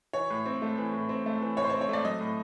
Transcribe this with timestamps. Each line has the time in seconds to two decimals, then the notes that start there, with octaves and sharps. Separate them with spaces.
0.13 E3 C#5
0.30 A2
0.46 C4
0.62 A3
0.77 E3
0.93 A2
1.09 C4
1.26 A3
1.41 E3
1.57 A2 C#5
1.64 C5
1.70 C#5
1.73 C4
1.81 C#5
1.89 A3 D5
2.05 F#3 D#5
2.21 A2